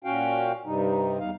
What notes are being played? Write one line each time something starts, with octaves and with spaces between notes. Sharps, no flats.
A#2 C#4 F#4 F5 G5
G2 C3 G3 D#4
E2 G3 D#4 F5